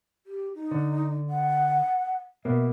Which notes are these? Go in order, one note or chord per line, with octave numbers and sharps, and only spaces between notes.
G4
D#4
D3
F#5
B2 A#3 E5